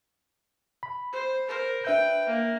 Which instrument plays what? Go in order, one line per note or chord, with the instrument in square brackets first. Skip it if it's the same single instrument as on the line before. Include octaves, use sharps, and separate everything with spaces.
[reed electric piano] B5
[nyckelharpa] C5
A#4 C5
[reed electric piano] D4 E5 G6 [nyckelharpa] B4 G5
[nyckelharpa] A#3